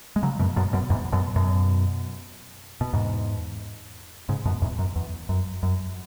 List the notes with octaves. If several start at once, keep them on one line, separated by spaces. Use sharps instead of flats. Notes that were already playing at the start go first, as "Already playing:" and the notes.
G#3
C#3 F#3
F#2 B2
F#2 B2
F#2 B2
E2 G#2
F#2 B2
F#2 B2
B2
E2 G#2
G#2 C#3
F#2 B2
E2 G#2
F#2
E2
F#2
F#2